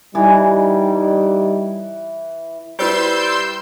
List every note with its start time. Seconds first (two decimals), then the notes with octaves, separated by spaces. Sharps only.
0.15 E3 G3 D#4
2.79 G3 E4 B4 C5 C6 E6 G6